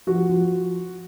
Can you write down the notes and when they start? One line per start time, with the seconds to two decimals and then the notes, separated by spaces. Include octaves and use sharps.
0.07 F3 F#4
0.29 F3